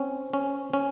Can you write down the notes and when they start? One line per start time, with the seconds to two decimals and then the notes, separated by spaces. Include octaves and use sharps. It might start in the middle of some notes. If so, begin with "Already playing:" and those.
Already playing: C4 C#4
0.34 C#4
0.73 C#4